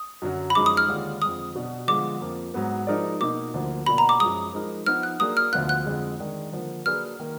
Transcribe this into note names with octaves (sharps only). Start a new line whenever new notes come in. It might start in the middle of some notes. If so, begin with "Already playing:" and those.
Already playing: D#6
F#2 D3 F#3
B5
F#2 F3 G#3 D#4 D6
D#6
F6
D#2 D3 G#3 D4 F4
F2 D3 G#3 D#6
B2 F#3 B3 D4 F#4
D3 F3 G#3 B3 F4 D6
F2 F3 A#3
G#2 F#3 B3
F3 G#3 D#4 A#4 D5
B2 A#3 D#4 D6
D2 D3 F3 A#3
B2 F#3 A#3 D4 F#4 B5
A#5
D6
F#2 F3 G#3 D#6
F3 G#3 D#4 A#4
F3 B3 D#4 F6
F#6
F#3 A#3 D4 G#4 D#6
F6
D2 D3 F3 B3 F4 F#6
F#6
F2 D3 G#3
D#3 G#3 D4 G#4
D3 F3 A#3
F#3 A#3 D4 G#4 B4 F6
D#3 A#3